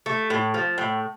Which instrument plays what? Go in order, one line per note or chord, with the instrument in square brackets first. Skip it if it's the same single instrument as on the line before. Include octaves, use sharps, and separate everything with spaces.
[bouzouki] A3
A2
F3
A2